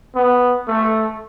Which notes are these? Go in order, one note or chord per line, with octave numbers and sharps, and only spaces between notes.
B3
A3